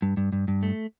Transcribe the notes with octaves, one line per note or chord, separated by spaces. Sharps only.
G2
G2
G2
G2
A3